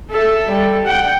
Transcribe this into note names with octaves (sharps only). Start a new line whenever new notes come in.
A4 E5
G3 A4
F#5 G5